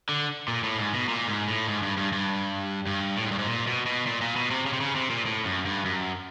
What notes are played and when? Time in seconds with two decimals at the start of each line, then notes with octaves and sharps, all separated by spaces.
0.09 D3
0.48 A#2
0.63 A2
0.78 G#2
0.93 B2
1.08 A#2
1.28 G#2
1.48 A2
1.68 G#2
1.82 G2
1.97 G2
2.13 G2
2.87 G2
3.17 A2
3.25 G#2
3.31 G2
3.39 G#2
3.47 A#2
3.67 B2
3.86 B2
4.06 A#2
4.22 A#2
4.36 B2
4.51 C3
4.66 C#3
4.73 C3
4.81 C#3
4.96 C3
5.10 A#2
5.26 A2
5.45 F#2
5.65 G2
5.85 F#2